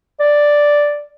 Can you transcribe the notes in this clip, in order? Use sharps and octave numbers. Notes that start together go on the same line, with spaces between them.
D5